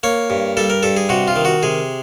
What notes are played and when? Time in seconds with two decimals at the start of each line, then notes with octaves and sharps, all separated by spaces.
0.03 A#3 C#5
0.30 G2
0.57 G3 A4
0.70 A#4
0.83 G2 A4
0.97 G#4
1.09 C3 F#4
1.28 F4
1.36 D#3
1.45 F#4
1.63 C3 G#4